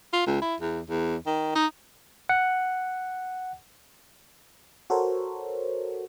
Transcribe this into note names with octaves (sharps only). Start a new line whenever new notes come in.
F4
C#2
E4
E2
E2
D#3
D#4
F#5
F#4 A4 A#4 C5 C#5